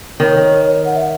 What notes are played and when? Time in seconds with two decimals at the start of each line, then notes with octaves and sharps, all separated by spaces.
0.20 D#3 C#5
0.85 F#5
0.95 E5